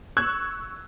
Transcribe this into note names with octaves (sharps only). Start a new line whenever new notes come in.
C#6 E6 F#6 G#6